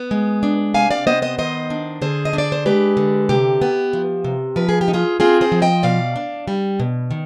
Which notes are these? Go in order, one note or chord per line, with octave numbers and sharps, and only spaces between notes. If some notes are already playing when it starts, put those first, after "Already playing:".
Already playing: B3
G#3
D4
C3 F5 G#5
D5 F5
B3 C5 D#5
C5 D#5
D#3 C5 D#5
D4
D3 G#4 C5
D#5
D4
D5
C5
G#3 G4 B4
D3
C3 G4
B3
F3
C3
F3 B4
G#4
G4
D#4
F4 G#4
C4 F4 G#4
G#4 C5
F3
D#5 G5
B2 D5 F5
D4
G3
B2
D#3